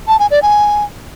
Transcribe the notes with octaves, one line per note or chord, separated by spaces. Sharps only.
A5
G#5
D5
G#5